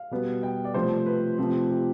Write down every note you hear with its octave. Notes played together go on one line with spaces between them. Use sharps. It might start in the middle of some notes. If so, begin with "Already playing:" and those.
Already playing: F5
B2 G3 B3
G5
D5
C3 F3 A3 C5
B4
C3 F3 A3 C4
G4